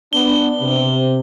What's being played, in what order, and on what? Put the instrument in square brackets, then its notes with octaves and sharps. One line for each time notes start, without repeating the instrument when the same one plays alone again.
[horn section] B3 D4 [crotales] G7
[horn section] C3